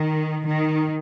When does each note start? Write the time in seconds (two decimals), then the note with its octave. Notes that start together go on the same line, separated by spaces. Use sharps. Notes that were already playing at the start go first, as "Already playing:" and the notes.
Already playing: D#3
0.46 D#3